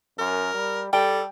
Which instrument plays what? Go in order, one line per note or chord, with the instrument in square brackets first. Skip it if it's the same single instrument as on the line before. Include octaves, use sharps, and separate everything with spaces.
[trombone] F#2 [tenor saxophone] A#4
[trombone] G3
[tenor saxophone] G3 [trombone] A4 [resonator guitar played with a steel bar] G5